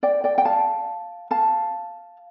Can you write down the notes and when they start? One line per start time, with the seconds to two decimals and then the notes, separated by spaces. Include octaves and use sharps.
0.03 D5 G5
0.24 D5 G5
0.38 G5
0.45 F5 A5
1.31 F5 A5